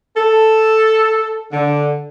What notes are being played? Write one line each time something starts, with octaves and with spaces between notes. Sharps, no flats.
A4
D3